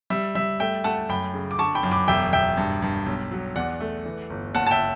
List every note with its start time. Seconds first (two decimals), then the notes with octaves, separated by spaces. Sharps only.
0.10 G3 E5
0.35 G3 E5
0.60 A3 E5 G5
0.84 A3 F#5 A5
1.09 F#2 G5 B5
1.34 C#3
1.51 D6
1.59 D3 A5 C#6
1.75 G5 B5
1.83 F#2
1.91 B5 D6
2.08 E1 E5 G5
2.33 E1 E5 G5
2.57 G2
2.82 G2
3.06 B1
3.32 F#3
3.56 E2 D5 F#5
3.80 A3
4.05 E3
4.30 G1
4.55 F#1 F#5 A5
4.66 A5
4.71 E5 G5